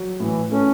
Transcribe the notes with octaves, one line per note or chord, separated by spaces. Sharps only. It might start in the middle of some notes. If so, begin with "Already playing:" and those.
Already playing: F#3
A2 E3
A3 C#4